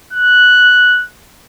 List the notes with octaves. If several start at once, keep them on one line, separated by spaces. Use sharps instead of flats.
F#6